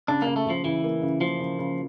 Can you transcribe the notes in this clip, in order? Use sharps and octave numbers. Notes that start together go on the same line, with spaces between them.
C#3 D4
C#3 A#3
A3
C#3 F3
C#3 E3
A#3
C#3
E3 F3
C#3
C#3